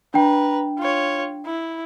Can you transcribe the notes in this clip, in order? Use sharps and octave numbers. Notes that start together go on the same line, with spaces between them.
D4 B4 G5 A#5
F4 C#5
E4